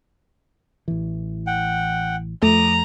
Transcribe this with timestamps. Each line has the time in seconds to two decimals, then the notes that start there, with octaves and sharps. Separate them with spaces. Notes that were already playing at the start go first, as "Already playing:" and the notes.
0.88 A1 E3
1.47 F#5 G5
2.43 F2 F3 A3 A#5 D6 D#6